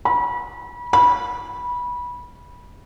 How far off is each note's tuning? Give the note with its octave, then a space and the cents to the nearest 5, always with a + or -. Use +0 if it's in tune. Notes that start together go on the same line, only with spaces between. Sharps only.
B5 -35
B5 -20